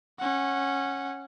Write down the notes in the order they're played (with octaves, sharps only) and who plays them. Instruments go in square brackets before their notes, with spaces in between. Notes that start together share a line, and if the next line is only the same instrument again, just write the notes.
[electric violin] C#4 F#5